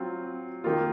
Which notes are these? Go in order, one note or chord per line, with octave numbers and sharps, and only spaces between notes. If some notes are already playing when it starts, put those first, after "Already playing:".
Already playing: F#3 C4 F4
D#3 A#3 F4